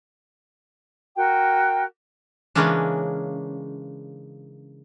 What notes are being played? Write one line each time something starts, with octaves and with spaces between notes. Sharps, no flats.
F#4 A#4 G5
C#3 E3 G#3 A#3 C#4 D4